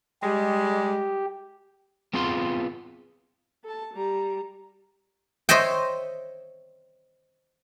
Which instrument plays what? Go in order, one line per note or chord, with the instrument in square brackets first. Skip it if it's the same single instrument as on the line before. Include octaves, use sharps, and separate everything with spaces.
[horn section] G3 G#3 [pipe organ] G4
[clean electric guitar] B3 C4 F4 G#4 F5 C6
[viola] A4 A5
G3 A#5
[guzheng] C5 C#5 D#5 E5 G5